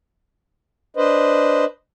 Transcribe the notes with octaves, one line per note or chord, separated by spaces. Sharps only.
D4 B4 C5 D#5